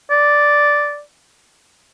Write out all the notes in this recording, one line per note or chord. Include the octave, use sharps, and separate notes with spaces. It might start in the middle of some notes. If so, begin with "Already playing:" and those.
D5